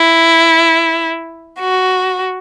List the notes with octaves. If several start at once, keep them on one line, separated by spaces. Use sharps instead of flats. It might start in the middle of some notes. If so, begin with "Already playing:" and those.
Already playing: E4
F#4